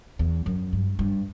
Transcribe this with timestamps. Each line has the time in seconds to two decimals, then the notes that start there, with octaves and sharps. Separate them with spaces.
0.19 E2
0.46 F#2
0.73 G2
0.99 G2